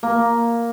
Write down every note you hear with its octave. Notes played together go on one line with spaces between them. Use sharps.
A#3